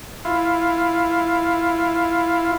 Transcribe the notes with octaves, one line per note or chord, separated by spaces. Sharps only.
E4 F4